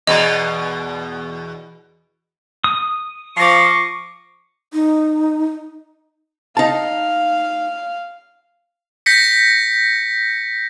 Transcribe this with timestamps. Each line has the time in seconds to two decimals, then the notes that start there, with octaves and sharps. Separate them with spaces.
0.07 E2 B2 D#5
2.64 D#6
3.37 F3 C#6 D6 A#6 C7
4.73 D#4
6.57 D#4 F5 A5
9.06 G6 A#6 B6 C#7